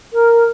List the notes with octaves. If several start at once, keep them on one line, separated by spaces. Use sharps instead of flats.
A#4